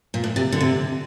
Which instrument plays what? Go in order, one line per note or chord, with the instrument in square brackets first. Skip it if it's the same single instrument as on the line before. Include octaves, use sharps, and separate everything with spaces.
[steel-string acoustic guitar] A#2
A2
C3
D3
C3